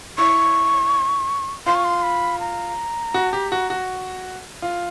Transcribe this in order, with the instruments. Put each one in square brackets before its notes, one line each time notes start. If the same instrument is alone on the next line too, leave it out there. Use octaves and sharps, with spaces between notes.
[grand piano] E4 [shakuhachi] C#6
[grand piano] F4 [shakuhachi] C6
[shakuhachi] C#6
C6
B5
A#5
[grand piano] F#4
G4
F#4
F#4
F4